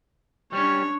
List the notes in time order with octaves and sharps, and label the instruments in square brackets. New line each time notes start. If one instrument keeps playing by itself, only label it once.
[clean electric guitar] G3 C#4 [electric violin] D4 C#5